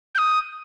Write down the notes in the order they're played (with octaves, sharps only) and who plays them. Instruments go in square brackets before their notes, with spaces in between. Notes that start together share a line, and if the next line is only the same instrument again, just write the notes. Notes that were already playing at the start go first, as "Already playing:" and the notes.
[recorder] G6
D#6